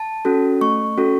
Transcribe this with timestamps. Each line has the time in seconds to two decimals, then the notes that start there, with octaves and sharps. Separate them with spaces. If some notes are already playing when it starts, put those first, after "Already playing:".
Already playing: A5
0.25 C#4 F#4 A4
0.61 A3 C#6
0.98 C#4 F#4 A4